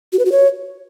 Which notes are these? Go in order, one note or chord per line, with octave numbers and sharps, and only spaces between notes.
F#4
B4
F#4
C#5